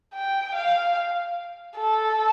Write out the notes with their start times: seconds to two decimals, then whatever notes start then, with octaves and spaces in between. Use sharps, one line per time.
0.14 G5
0.55 F5
1.76 A4